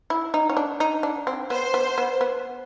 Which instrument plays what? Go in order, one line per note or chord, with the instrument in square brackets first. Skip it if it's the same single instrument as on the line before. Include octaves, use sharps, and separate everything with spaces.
[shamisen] E4
D#4
C#4
D4
D#4
D4
C4
[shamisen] B3 [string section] C5
[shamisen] B3
B3
B3